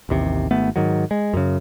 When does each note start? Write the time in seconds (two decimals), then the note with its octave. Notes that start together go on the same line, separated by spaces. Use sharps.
0.09 A1 D#2 C3
0.51 G#1 A3 B3
0.76 G#2 D#3 F#3
1.11 G#3
1.34 F#2 C#3